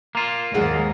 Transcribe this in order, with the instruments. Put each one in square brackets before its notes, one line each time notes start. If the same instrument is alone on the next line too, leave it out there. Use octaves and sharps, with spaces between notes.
[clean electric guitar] A#3 F4
[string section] D#2 G#2 [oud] G#3 F#4